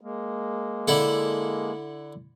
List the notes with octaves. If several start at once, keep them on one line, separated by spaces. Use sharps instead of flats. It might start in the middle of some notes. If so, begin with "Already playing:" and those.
G#3 A#3
D3 E4 A4